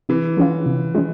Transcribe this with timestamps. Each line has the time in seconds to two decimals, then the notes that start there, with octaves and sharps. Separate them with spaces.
0.09 C3 E3
0.37 F3 G#3 C#4 F4
0.66 C3
0.95 F3 G#3 C#4